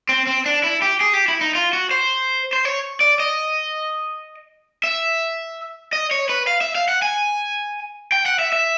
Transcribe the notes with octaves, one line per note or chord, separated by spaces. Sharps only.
C4
C4
D4
E4
G4
G#4
G4
E4
D#4
F4
F#4
C5
C5
C#5
D5
D#5
E5
D#5
C#5
B4
F5
E5
F5
F#5
G#5
G5
F#5
E5
E5